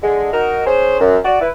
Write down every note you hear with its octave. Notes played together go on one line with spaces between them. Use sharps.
D3 G#3
D#4 F#4 A#4
C#4 G#4 C5
F#2
F#4 D5
E4 B4